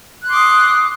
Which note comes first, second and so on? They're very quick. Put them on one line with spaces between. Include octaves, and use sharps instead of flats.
F#6 C6 D6 D#6